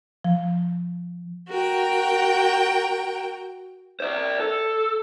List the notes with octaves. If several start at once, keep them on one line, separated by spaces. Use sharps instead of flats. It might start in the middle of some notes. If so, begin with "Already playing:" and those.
F3
F#4 A#4 G5
C5 D5
A4